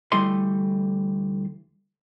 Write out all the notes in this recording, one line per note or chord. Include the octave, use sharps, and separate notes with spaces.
D2 E3 G3 A3 D#5 C6